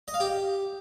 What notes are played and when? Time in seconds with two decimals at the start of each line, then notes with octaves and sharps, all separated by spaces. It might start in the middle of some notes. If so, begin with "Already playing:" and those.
0.08 D#5
0.14 F5
0.20 G4